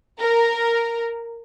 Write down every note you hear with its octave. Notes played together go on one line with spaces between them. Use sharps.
A#4